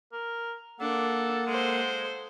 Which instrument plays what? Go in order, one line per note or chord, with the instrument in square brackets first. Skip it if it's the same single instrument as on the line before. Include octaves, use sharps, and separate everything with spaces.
[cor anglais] A#4
[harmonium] A#3 F#5 [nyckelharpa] D4 [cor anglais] A4
[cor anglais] G#3 [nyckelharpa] A4 C5